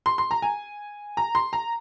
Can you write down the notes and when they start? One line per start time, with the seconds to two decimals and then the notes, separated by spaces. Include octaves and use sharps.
0.06 C6
0.18 C6
0.31 A#5
0.42 G#5
1.17 A#5
1.35 C6
1.53 A#5